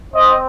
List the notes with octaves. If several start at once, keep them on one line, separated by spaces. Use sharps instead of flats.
C4 C5 D#5